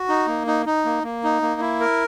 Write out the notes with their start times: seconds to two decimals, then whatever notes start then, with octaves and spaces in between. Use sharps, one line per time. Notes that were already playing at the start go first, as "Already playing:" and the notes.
Already playing: F#4
0.09 D#4
0.27 A#3
0.47 D#4
0.66 D#4
0.85 A#3
1.03 A#3
1.24 D#4
1.42 A#3
1.61 E4
1.80 A#4